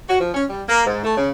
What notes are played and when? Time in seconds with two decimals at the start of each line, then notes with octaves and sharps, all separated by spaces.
0.08 F#4
0.20 F3
0.34 C#4
0.49 G3
0.68 A#3
0.86 G#2
1.04 A3
1.17 C#3